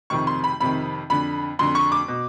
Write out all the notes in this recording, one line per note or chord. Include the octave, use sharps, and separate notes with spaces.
F2 C3 D#3 C#6
C6
B5
F2 C3 D#3 B5
F2 D3 B5
F2 D3 C6
C#6
D6
B2